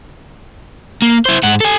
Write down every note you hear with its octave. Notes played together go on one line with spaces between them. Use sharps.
A#3
E4 C5
G#2 F#5
A4 G#5